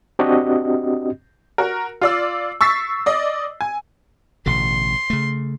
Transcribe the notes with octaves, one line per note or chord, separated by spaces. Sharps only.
C4 D4 F#4 G4 D#5
F#4 A#4
F4 D5 E6
C#6 E6 A6 B6 C7
D5 D#5
G#5
A1 B2 D3 C6
C#3 A3